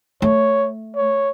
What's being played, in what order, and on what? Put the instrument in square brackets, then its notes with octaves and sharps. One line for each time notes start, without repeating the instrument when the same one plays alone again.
[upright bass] A3 [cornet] C#5
[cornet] C#5